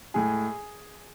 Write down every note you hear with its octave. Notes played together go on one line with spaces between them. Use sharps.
A2 G#3 G#4 G#5